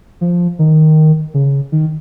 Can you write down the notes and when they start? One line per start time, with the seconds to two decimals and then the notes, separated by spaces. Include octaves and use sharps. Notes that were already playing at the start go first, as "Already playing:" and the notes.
0.21 F3
0.59 D#3
1.34 C#3
1.72 D#3